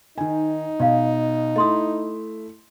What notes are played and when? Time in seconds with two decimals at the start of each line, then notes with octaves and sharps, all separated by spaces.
0.18 D#3 D#4 G#5
0.80 B2 D5 F5
1.56 A3 E4 D#5 C6 D#6